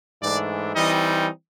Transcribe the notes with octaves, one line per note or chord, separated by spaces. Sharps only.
G#2 E3 A3 D4 D5
E3 G3 C4 D#4 D#5